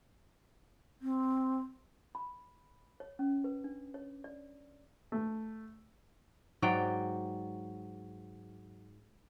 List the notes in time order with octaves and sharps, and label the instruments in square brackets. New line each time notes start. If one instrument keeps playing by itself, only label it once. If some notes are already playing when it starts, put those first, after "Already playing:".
[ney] C4
[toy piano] B5
C#5
C#4
B4
D4
C#5
D5
[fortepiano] A3
[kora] G#2 F#3 D5 G5